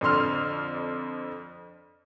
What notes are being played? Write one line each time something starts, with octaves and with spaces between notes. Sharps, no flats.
F2 D3 C6 F6